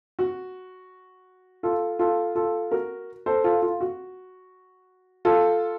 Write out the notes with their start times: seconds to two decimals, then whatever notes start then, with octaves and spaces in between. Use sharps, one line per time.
0.19 F#4
1.63 F4 A4
1.99 F4 A4
2.35 F4 A4
2.71 F#4 A#4
3.26 A4 C5
3.44 F4 A4
3.62 F4
3.81 F#4
5.25 F4 A4